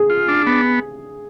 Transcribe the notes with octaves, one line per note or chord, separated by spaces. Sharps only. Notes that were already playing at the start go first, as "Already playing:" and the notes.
Already playing: G#4
F4
D4
B3